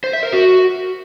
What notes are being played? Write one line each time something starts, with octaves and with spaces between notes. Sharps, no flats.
C5
E5
A#4
F#4